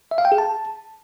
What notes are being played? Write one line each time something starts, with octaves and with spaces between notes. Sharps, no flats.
E5
F5
G5
G#4
A5